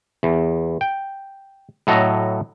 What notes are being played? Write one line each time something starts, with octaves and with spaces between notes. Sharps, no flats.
E2
G5
A2 F#3 A4 D#5 A#5